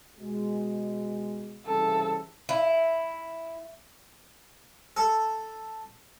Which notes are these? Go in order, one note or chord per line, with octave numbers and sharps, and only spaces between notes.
B2 G#3
C2 C#3 E3 A4
E4
A4